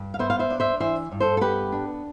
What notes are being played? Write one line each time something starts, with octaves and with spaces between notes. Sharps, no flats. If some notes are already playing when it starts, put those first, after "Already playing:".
Already playing: G2
F5
B3 C5 E5
F5
C5 E5
D4
C5 E5
E3 C5 E5
G2
A4 C5
A4
B3 G4 B4
D4